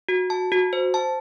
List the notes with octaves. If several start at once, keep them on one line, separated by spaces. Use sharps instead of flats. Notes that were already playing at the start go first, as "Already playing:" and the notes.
F#4
A5
F#4
C5
A5